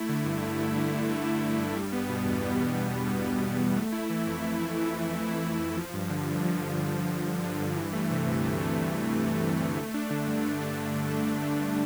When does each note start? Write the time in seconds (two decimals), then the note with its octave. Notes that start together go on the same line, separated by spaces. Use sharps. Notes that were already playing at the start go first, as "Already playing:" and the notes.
Already playing: A3 E4
0.09 D3
0.25 G2
0.42 A3
0.59 E4
0.76 D3
0.92 G2
1.09 A3
1.26 E4
1.43 D3
1.59 G2
1.76 G3
1.92 B3
2.09 B2
2.25 E2
2.43 G3
2.59 B3
2.76 B2
2.93 E2
3.09 G3
3.26 B3
3.43 B2
3.59 E2
3.77 A3
3.92 E4
4.10 E3
4.27 F2
4.43 A3
4.59 E4
4.77 E3
4.93 F2
5.10 A3
5.27 E4
5.43 E3
5.60 F2
5.77 F3
5.93 G2
6.10 D3
6.27 G2
6.44 F3
6.60 G2
6.77 D3
6.94 G2
7.10 F3
7.27 G2
7.43 D3
7.61 G2
7.77 E3
7.93 A3
8.11 C3
8.27 D2
8.43 E3
8.60 A3
8.77 C3
8.93 D2
9.10 E3
9.27 A3
9.43 C3
9.61 D2
9.77 A3
9.94 D4
10.10 D3
10.27 G2
10.44 A3
10.61 D4
10.78 D3
10.94 G2
11.10 A3
11.27 D4
11.44 D3
11.61 G2